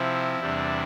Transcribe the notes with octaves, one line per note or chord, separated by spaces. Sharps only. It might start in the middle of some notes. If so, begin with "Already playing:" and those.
Already playing: C3 F3 C4 E4
E2 C3 G3 D4